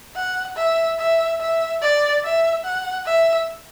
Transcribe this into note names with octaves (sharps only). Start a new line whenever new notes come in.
F#5
E5
E5
E5
D5
E5
F#5
E5